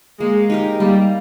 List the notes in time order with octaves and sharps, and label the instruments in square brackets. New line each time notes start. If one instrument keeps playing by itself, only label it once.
[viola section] G#3 [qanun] A#3
[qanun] D#4 G4 A#4
[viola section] G3 [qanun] A#3